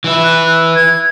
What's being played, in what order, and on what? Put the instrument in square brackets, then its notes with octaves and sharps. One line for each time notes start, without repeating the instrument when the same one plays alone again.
[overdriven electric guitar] E3 E4
[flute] F#6
G#6